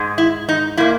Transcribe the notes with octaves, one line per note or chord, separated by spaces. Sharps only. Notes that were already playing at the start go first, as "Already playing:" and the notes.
Already playing: G#2 G#3
E4
D#4
A#2 A#3 E4